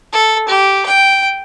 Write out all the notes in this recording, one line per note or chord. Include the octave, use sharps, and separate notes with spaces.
A4
G4
G5